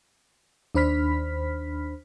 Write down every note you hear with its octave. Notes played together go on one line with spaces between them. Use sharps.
D#2 D4 C5 B5 F6 B6